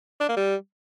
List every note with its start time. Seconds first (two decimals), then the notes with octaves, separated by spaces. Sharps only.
0.21 D4
0.29 A#3
0.37 G3